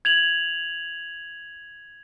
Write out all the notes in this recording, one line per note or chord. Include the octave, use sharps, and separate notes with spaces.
G#6 F7 F#7